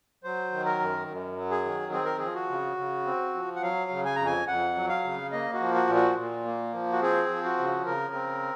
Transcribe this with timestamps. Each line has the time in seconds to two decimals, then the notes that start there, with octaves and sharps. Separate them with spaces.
0.24 F#3 C5
0.52 D#3
0.65 A#4
0.80 F#2
1.07 F#2
1.36 F#3
1.51 G#4
1.65 D#3
1.92 C4 G#4
2.05 A#4
2.18 F3 G#4
2.35 F#4
2.49 C#3
2.77 C#3
3.06 C4
3.34 F3
3.56 F#5
3.62 F#3 F5
3.91 C#3
4.05 G#5
4.16 F2 A#5
4.26 G#5
4.47 F2 F#5
4.75 F#3
4.89 F5
5.04 C#3
5.32 A#3 D#5
5.54 F#4
5.60 F3
5.75 F#4
5.88 A#2
5.95 F#4
6.17 A#2
6.45 A#3
6.73 F3
6.92 F#4
7.01 C4 G#4
7.29 F3
7.44 F#4
7.58 C#3
7.86 C#3 A#4
8.14 C4